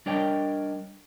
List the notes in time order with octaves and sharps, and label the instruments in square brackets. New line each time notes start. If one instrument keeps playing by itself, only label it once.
[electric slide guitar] G3 D4 A#4 C#5 D#5 G5